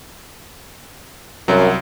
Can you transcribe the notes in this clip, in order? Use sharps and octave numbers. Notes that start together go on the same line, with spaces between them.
C2 F#2 F#3